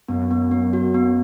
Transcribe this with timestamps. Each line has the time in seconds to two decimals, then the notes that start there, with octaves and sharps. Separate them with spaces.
0.08 F#2 B3
0.31 B3
0.51 B3
0.73 F#4
0.94 B3